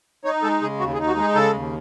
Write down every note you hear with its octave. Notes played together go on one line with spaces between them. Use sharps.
D#4 C#5
G#3 A4
C#3 G#4
D#2 F#4
G#4
D#4
F#4
G#3
G#4
C#3 A4
D#2